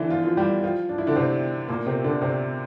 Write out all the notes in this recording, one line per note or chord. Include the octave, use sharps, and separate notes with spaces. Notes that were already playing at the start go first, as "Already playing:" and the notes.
Already playing: D3 E3 D4 E4
F3 F4
F3 F4
G3 G4
F3 F4
D4
E4
D3 D4
C3 C4
A#2 A#3
C3 C4
D3 D4
C3 C4